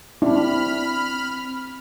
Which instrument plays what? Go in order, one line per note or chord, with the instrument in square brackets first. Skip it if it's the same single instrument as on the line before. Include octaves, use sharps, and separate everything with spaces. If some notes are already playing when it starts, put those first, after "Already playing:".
[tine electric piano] C4 [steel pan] D4 E4 [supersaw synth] B5 F6